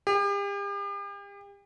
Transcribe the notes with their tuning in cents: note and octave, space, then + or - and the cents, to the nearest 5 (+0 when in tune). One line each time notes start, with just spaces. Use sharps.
G4 +40